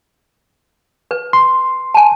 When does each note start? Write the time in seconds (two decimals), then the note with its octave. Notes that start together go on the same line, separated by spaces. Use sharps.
1.11 B4
1.33 C6
1.94 G#5 A5